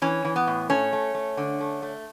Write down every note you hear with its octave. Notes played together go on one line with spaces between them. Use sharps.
E3 C#4
E3
B3
A2
A3 C#4
A3
A3
D3
A3
A3